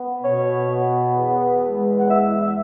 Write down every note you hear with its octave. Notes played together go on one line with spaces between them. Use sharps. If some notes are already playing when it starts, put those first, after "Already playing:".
Already playing: B3
B2 C#5
B3
E2
G#3
F#5
E2 E5
E5